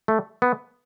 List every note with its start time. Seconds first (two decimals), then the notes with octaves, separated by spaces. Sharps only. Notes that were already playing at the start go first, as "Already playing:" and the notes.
0.08 A3
0.42 B3